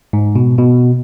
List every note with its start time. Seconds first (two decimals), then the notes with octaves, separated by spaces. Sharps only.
0.13 G#2
0.36 B2
0.59 B2